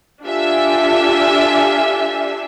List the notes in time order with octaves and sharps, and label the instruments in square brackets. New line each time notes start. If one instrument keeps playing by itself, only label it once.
[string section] D4 F4 G4 A4 E5 G#5